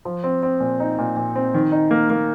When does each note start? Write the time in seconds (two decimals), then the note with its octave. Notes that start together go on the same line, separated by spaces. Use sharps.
0.05 F3
0.24 C4
0.43 C4
0.60 A#2
0.80 D#4
0.98 A#2
1.16 A#2
1.36 C4
1.54 D#3
1.72 D#4
1.91 A#3
2.10 A#3